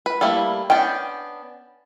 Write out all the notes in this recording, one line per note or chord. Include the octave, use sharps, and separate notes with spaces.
B4
G3 A3 A#3 E4
B3 C#4 D4 G5